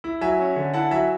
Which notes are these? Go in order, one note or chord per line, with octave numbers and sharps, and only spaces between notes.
E4
F#3 E5 G#5
C#4
D3
E4 F#5 A5
F#3 E5 G#5